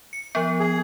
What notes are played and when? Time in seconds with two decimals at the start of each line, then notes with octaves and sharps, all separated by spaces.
0.13 C#7
0.35 F3 B3
0.60 G#4